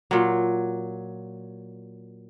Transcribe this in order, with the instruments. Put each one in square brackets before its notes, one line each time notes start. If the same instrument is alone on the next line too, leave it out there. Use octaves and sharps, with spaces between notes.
[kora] A#2 F#3